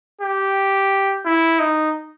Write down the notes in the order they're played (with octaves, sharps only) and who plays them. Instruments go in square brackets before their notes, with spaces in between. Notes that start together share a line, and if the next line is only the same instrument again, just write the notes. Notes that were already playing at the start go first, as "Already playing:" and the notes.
[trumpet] G4
E4
D#4